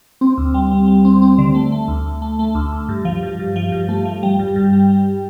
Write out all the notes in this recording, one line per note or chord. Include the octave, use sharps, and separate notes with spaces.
C4
D2
G3
G3
G3
C4
C4
D3
A3
A3
D2
D2
A3
A3
D2
D2
G2
F3
G2
G2
F3
G2
A3
F3
G3
G2
G2
G3
G3